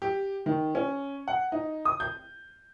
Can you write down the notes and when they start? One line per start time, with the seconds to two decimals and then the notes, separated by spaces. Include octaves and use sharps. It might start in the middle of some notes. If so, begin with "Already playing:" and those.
0.02 G4
0.46 D#3
0.75 C#4
1.28 F#5
1.52 D#4
1.85 D#6
2.00 G6